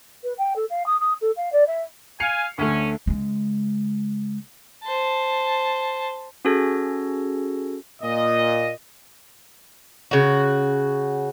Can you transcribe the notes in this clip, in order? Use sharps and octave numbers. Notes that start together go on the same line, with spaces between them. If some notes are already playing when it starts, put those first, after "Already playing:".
B4
G5
A4
F5
D#6
D#6
A4
F5
D5
E5
F5 G#5 C7 C#7 F7
D2 A3 C#4
C#3 G#3
C5 A5
C#4 F#4 G#4 A4 G#6 A#6
A#2 D#5
C#3 F#4